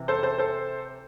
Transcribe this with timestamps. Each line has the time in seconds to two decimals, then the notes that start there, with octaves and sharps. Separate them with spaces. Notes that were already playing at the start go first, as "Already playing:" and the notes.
Already playing: C3 E3
0.08 A4 C5
0.23 A4 C5
0.38 A4 C5